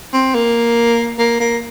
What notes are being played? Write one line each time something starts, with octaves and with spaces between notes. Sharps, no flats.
C4
A#3
A#3
A#3